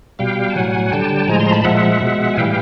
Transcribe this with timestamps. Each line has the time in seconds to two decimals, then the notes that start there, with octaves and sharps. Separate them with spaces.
0.19 B2 G3 F5 G5
0.50 A5
0.55 A2 F#3 F#5 G#5
0.92 D3 G3 G5 A5
1.28 A2 F3 G#3 G#5 A#5
1.40 A#5 C6
1.52 A5 B5
1.64 A#2 F3 G#3 E5 F#5
2.01 B2 G#3
2.34 G#5
2.36 A2 E3 G3 F5 G5